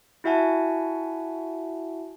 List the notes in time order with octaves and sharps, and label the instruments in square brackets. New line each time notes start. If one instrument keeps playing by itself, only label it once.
[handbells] E4 F#4 E5 F#5 G#5 A5